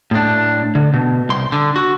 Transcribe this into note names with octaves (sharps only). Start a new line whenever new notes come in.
A2 D4
D3
B2
C2 C6
D3
F#4